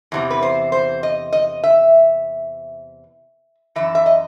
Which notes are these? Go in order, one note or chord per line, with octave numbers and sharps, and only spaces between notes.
E2 C3 E3
B4
C5
C5
D#5
D#5
E5
F#2 E3 E5
E5
D#5